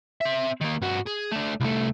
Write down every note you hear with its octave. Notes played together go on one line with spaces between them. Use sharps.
C4 E5
D#3 A#3
G2 F#4
G#4
A3 D4
C2 A3